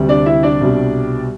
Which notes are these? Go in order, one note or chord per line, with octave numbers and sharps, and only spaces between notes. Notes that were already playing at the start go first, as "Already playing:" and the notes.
Already playing: D2 C3 G3
D4 D5
E4 E5
D4 D5
C2 B2 G3